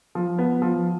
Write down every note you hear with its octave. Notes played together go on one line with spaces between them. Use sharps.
F3
B3
F3